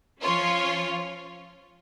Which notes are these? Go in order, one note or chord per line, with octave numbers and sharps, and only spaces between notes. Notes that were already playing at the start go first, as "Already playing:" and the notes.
F3 C#4 F4 C#5